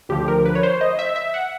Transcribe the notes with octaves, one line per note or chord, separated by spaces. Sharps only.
D2 D3 F3 G4
A#4
B4
C#5
C5
D#5
E5
E5
F#5